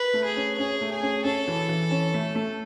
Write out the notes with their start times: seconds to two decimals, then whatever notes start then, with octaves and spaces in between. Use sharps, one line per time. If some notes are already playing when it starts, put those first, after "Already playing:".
Already playing: B4
0.13 A3
0.25 G#4
0.36 C#4
0.58 C#4 G#4
0.81 A3
0.91 G#4
1.03 C#4
1.24 C#4 A4
1.48 E3
1.69 E3
1.91 C#4
2.14 A3
2.35 A3